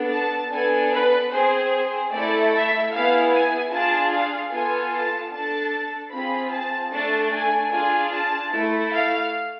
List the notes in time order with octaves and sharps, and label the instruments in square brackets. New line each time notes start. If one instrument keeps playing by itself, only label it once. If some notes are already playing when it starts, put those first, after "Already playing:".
Already playing: [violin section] B3 D4 A4
A5
B3 D4 A4 G#5
B4
C4 G#4 C5
C5
A3 E4 A4 D5
E5
B3 E4 G#4 F5
G#5
D4 F4 G#4 A5
F5
B3 F4 A4 G#5
A5
D4 A4 A5
C4 F4 G#4 B5
A5
A3 D4 A4 A5
G#5
D4 F4 G#4 G#5
A5
A3 E4 A4
F5